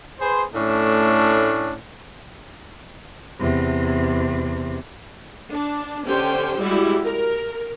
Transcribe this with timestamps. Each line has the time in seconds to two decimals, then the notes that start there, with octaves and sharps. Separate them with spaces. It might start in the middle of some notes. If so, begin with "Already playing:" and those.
0.20 G#4 B4 C5
0.54 A2 A3 C#4 D4
3.39 E2 C3
5.51 D4
6.06 D3 C#4 G4 C5 G5
6.59 G3 G#3 E4 F#4 G4
7.04 A#4